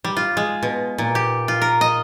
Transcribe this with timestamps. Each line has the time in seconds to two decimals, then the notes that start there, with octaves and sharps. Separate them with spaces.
0.04 G3
0.17 F4
0.37 G#3
0.63 B2
0.98 A#2
1.15 G4
1.48 F4
1.62 A#4
1.81 D#5